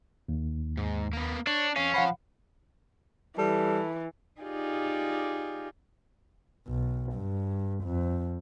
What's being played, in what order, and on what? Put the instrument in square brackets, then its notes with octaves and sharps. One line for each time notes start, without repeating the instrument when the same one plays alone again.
[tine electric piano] D#2
[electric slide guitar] G#2
A#3 B3
[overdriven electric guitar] D4 [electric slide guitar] C#5
[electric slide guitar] F2 F5 [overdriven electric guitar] C#4
[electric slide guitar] F3 C5 [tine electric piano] F5 F#5 B5
[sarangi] E3 [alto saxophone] G3 [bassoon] A4
[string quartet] D#4 F4 G4 G#4 D5
[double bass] B1
G2
F2